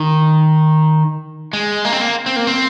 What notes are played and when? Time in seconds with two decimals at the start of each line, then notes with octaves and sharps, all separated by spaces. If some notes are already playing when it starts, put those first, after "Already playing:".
Already playing: D#3
1.53 G#3
1.85 A#3
1.92 C4
2.01 A#3
2.26 C4
2.36 A#3
2.47 C4